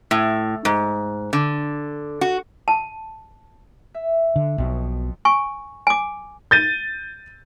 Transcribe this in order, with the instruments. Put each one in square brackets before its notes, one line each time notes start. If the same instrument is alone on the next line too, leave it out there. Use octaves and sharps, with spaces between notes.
[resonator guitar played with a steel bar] A2
G#2
D3
F#4
[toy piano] A5
[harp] E5
[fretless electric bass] D3
[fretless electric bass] B1 B2 [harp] F2
[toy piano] G#5 C#6
G#5 D6
[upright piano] G6 A6 D#7